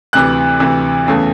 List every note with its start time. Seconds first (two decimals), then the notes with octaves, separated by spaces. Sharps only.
0.13 D2 C3 E3 F#6
0.60 D2 C3 E3
1.07 E2 C#3 E3 A3